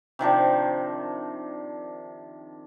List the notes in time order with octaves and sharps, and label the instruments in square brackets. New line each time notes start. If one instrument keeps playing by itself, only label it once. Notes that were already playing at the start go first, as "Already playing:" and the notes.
[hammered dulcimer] C3 D#3 F3 D4